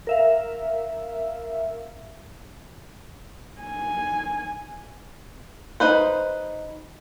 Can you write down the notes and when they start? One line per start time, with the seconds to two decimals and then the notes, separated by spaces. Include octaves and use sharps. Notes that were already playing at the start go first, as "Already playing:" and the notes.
0.07 A#4 E5 F5
3.61 G#5
5.80 D#4 B4 C5